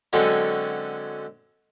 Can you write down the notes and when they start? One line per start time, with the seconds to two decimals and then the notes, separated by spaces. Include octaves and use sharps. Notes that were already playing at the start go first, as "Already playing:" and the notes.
0.13 D3 F#3 G#3 C4 C#4 A4